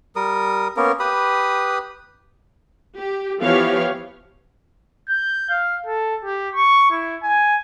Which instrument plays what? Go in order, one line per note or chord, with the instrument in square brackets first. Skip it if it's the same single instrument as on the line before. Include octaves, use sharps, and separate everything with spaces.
[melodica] G3 A#4 D#6
A#3 B3 C#4 A#4
G4 B4 B5 D#6
[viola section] G4
E3 F3 B3 G4 C#5 F5
[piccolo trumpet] G6
F5
A4
G4
C#6
E4
G#5